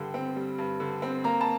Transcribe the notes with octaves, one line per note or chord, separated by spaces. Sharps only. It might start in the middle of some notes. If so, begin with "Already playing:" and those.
Already playing: G2 D3 G3 G5
C4
G3
G2
D3
C4
A#3 A#5
A5